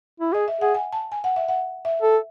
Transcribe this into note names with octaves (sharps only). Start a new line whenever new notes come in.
E4
G#4 D#5
E5
G#4 F#5
G#5
A5
G#5
F#5
E5
F#5
E5
A4